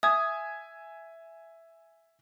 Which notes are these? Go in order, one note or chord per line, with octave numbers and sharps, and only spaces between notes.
E5 G#5 D#6 G#6